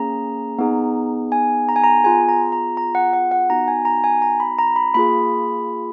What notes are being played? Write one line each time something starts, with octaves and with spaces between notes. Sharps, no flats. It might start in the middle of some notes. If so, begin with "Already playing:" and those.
Already playing: A#3 C#4 G#4 A#5
B3 D#4 G#4
G#5
A#5
G#5
A#5
B3 F4 G#4 G#5
A#5
A#5
A#5
F#5
F#5
F#5
B3 D#4 F#4 A#5
G#5
A#5
G#5
A#5
B5
A#5
B5
A#3 F4 G#4 B5